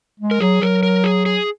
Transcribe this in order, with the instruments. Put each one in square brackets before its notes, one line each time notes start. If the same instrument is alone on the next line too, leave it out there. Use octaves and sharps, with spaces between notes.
[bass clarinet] G#3
[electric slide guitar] A#4
[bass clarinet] F#3 [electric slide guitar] G#4
[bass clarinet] F#3 [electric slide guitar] A#4
[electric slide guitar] A#4
G#4
G#4